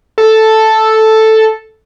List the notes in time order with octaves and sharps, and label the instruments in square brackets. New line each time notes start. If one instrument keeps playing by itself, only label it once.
[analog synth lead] A4